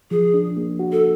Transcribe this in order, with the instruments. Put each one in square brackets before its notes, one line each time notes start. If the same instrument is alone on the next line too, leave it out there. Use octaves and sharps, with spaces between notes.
[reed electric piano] F3 [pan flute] G#4
[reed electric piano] D4
A#3
F#4
[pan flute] A4